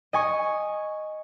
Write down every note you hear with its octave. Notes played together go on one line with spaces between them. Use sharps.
D#5 G#5 C#6